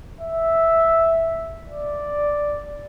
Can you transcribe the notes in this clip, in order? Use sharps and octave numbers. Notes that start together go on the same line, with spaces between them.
E5
D5